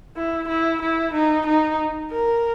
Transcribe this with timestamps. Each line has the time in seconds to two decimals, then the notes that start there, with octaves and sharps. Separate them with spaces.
0.17 E4
0.49 E4
0.82 E4
1.14 D#4
1.47 D#4
2.11 A#4